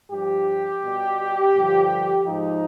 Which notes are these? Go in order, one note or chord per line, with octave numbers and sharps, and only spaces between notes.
G2 F3 G4
B2 G3
G2 D3 F3
G#2 F3 D#4